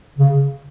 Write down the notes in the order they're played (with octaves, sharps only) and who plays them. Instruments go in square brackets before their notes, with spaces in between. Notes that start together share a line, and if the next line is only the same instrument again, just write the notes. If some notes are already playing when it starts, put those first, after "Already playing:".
[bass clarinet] C#3